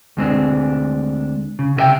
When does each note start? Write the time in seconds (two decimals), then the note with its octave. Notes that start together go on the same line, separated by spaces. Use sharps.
0.17 D2 G#3 C4 D4
1.59 C#3
1.76 C2 C#3 F4 B4 E5 G5